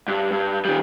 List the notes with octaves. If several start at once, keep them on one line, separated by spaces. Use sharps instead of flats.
G2
G2
D#3 G3